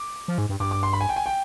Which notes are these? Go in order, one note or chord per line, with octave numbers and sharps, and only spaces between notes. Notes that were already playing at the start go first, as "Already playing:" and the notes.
Already playing: D6
F3
G#2
G2
G2 D6
D6
C6
B5
G#5
G5
G#5
G5